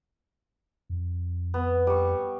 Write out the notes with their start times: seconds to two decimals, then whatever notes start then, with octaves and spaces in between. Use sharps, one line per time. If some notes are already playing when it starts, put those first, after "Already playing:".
0.90 F2
1.54 B3
1.87 G3 C#6